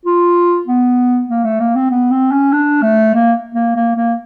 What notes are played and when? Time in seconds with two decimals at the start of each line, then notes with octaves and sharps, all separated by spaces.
0.05 F4
0.67 B3
1.29 A#3
1.44 A3
1.60 A#3
1.75 C4
1.90 B3
2.11 C4
2.31 C#4
2.52 D4
2.82 A3
3.14 A#3
3.55 A#3
3.76 A#3
3.96 A#3